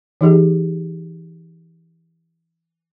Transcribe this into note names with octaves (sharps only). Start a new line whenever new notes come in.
E3 D#4 G4 G#4